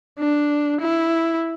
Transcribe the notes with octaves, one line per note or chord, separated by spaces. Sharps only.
D4
E4